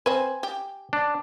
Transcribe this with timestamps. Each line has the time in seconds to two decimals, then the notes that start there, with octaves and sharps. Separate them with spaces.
0.06 C4 B4 G#5
0.43 G4
0.93 D4